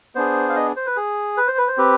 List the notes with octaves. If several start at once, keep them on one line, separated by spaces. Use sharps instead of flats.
B3 D4 G#4 C5
F5
D#5
C5
B4
G#4
B4
C5
B4
C5
C4 G4 B4